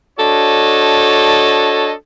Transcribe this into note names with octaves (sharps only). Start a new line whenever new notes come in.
D4 F#4 A4 C#5 D#5